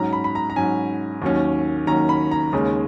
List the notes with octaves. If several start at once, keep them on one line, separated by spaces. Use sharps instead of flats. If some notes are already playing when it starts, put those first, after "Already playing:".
Already playing: G#2 F#3 C#4 A#5
B5
B5
A#5
A#5
G#2 F#3 C#4 G#5
D#2 D#3 F#3 C#4
D#2 D#3 F#3 C#4 A#5
B5
A#5
D#2 C#3 G#3 C#4